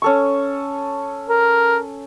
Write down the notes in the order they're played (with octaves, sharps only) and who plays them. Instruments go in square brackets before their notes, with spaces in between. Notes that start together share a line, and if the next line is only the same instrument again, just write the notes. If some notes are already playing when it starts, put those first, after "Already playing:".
[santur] C#4 A4 C#6
[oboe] A#4